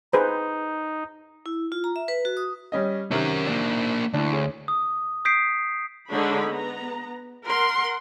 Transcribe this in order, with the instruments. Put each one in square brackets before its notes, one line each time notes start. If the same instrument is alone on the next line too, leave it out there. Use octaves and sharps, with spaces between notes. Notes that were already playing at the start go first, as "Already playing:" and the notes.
[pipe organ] D#4 [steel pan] G#4 B4 C5
[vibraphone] E4
F4
A#5
E5
B4
F#4
D#6
[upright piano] G3 C#4 D#5
[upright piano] C3 D#3 [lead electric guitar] C#4 A#4
[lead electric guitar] A#3 D4
[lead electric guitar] D2 [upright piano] D4 E4
[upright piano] C#4 G#4
[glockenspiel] D#6
D#6 G6 B6 C7 D7
[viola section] D3 G#3 D4 D#4 C#5 B5
B3 A#5
A#4 F#5 C6